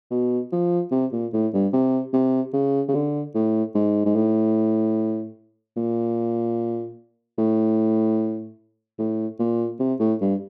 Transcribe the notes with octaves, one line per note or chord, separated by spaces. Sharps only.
B2
F3
C3
A#2
A2
G2
C3
C3
C#3
C#3
D3
A2
G#2
G#2
A2
A#2
A2
A2
A#2
C3
A2
G2